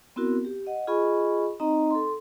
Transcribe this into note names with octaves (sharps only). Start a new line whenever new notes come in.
B3 C4 E4 F#4 A#4
G4
D#5 F#5
F4 G#4 D#5 G#5 B5 C#6
C4 D#4 D#5 A#5
A4 C6